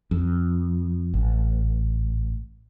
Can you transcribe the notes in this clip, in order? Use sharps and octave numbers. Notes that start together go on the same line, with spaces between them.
F2
A1